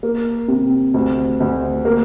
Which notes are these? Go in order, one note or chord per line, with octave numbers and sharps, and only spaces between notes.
A#3
C3
D2
D2
A#3